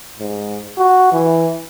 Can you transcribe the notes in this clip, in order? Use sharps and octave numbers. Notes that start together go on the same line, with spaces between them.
G#2
F#4
E3